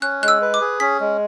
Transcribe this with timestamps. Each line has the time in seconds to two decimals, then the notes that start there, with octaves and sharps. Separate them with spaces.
0.02 C#4 F#6
0.22 G#3 F#6
0.28 E6
0.42 B4
0.54 D6
0.61 G#4
0.80 C#4 B6
1.00 G#3